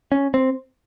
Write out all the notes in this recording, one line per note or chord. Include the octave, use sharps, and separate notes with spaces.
C#4
C4